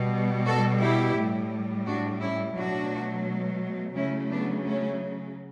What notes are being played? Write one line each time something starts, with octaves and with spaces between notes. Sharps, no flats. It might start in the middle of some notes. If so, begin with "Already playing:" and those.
Already playing: B2 G3
F#4 A4
E4 G4
A2 G3
D4 F#4
C#4 E4
B2 F#3 A3 D4 F#4
C#3 F#3 A3 C#4 E4
B3 D4
A3 C#4